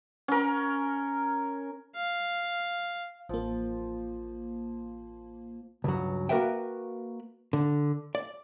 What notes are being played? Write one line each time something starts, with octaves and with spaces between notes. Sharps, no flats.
C#4 A#4
F5
A1 F3 A#3
C#2 G2 F#3
A#3 F#4 A#4 B4 E5 G5
D3
D5